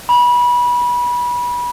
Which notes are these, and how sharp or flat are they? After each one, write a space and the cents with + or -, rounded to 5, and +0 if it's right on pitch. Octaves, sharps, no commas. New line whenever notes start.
B5 -25